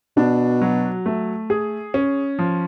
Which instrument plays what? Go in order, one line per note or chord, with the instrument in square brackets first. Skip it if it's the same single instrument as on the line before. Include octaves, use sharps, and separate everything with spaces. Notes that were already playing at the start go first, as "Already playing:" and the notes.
[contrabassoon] B2 [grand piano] D4
[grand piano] F#3
A3
G#4
C#4
F3